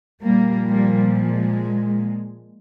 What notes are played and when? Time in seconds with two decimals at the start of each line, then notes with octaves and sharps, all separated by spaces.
0.23 A#2 F3 G3 A#3
0.69 G3 A#3
1.14 G#3